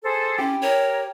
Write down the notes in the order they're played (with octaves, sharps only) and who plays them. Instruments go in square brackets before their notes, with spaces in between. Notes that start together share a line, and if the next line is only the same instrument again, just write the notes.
[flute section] G#4 A4 C5
[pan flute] C#4 [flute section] E4 [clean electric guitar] G4
[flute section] A#4 [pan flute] C#5